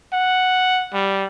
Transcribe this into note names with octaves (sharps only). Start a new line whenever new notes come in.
F#5
G3